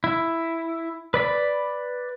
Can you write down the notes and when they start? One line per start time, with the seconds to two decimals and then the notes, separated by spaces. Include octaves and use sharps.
0.04 E4
1.14 B4 D5 B5